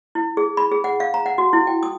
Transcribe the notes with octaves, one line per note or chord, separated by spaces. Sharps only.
E4
G#4
B5
G#4
F#5
F5
A#5
F#5
F#4
E4
G5
D#6